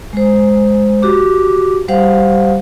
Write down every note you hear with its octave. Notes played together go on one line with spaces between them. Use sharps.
G#3 C5
F#4 G4 D6
G3 G4 C5 F5 F#5